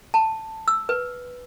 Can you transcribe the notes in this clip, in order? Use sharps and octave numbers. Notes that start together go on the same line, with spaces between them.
A5
E6
B4